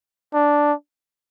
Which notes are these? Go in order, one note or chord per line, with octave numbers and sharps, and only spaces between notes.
D4